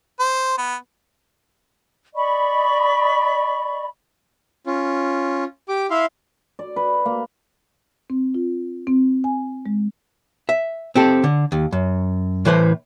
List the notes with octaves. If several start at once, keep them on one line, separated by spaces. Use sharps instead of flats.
C5
B3
D5 D#5 B5 C#6
C#4 F4
G4 D6
E4 E5 F5 C6
D5
B4
A#3
C4
F4
C4
G#5
G#3
E5
C4 G4 A4
D3
D#2
F#2
A2 E3 B4 C5